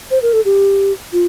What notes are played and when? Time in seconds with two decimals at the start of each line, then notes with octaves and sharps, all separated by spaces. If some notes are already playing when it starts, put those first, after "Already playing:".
0.11 C5
0.22 A#4
0.33 A4
0.45 G4
1.13 F4